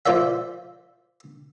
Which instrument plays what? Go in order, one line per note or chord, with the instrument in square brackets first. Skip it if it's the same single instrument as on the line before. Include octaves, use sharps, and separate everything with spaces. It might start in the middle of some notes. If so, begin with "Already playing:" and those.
[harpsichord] F3 C5 D5 E5